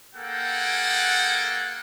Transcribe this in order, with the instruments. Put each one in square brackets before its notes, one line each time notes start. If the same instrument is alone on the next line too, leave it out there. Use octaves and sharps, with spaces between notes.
[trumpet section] A#3 G#4 A4 F#5 G5